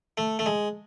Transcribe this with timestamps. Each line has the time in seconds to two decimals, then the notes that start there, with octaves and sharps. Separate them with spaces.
0.18 A3
0.39 A3
0.46 G#3